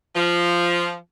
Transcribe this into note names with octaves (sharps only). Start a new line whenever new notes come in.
F3